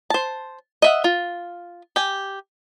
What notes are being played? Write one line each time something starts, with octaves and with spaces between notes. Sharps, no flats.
C5 A5
D#5 E5 F#5
F4
G4 G#5